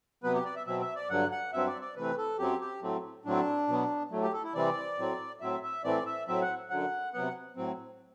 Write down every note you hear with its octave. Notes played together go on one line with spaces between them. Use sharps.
C3 F#3 B3 B4
G4
D5
E5
B2 F#3 C4 E5
E5
D5
G2 D3 F#3 F#5
F#5
G2 F#3 C4 E5
D5
D5
C3 E3 A3 C4 B4
A4
F#2 F#3 C4 G4
G4
A2 F#3 A3 C4
A2 F#3 A3 C4 D4
B2 F#3 B3
A2 F#3 A3
G4
A4
E4
C3 E3 G3 C4 D5
A2 F#3 C4
A2 F#3 C4 E5
E5
A2 E3 A3 C4 D5
E5
A2 F#3 C4 E5
F#5
F#2 D3 F#3 F#5
C3 F#3 B3 F#5
A2 F#3 C4